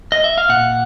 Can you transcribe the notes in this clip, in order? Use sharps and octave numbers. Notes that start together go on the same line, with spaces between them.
D#5
E5
F5
A#2 F#5